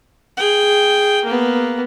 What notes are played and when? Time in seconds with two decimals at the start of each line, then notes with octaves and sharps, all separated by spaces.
0.37 G#4 G5
1.25 A#3 B3